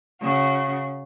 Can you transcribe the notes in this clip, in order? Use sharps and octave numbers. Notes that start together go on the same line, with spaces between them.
C#3 F#4